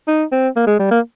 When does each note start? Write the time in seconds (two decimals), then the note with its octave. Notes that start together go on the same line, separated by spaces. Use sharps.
0.08 D#4
0.32 C4
0.56 A#3
0.67 G#3
0.79 G3
0.91 A#3